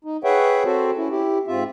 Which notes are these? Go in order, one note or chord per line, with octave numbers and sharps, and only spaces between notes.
D#4
G#4 B4 C#5 E5 F#5 G5
C4 F#4 A4 C5
C#4 E4
E4 G4
G#2 C4 F4 E5